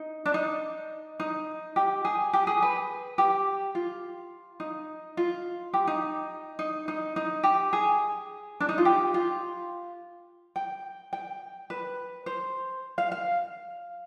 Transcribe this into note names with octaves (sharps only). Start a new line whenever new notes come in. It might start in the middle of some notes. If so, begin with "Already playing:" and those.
Already playing: D#4
D4
D#4
D#4
G4
G#4
G4
G#4
B4
G4
F4
D#4
F4
G4
D#4
D#4
D#4
D#4
G4
G#4
D4
D#4
F4
G4
F4
G5
G5
B4
C5
F5
F5